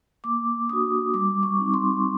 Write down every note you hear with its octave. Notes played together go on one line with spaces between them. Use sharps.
A#3 D6
D4 F#4 D#6
G3 D6
C#6
C4 D#4
C6